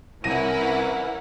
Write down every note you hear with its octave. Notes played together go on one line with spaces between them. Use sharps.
C2 E3 C#4 E4 A#4 F#5 A#6 D#7